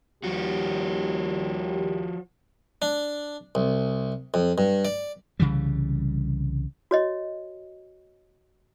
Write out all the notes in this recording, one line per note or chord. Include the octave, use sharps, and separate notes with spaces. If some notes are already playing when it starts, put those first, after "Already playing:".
D#2 F3 G3 F#4 G4
D4
C2
F2
G2
D5
C2 C#3 E3 G3
F#4 C#5 D#5